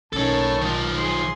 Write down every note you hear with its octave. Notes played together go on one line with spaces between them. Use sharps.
B1 D#3 F#3 C#4 A4 C#5 A5
D#3 G#3 F4
G#4 C6